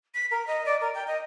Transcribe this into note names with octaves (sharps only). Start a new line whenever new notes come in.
B6
A#4
D#5
D5
A#4
G5
D#5